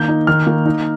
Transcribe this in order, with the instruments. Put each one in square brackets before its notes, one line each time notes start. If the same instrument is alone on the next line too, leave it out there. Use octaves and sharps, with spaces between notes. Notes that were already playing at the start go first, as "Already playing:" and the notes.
Already playing: [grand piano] D#3 A#3 G6
D#4
D#3 F6
A#3
D#4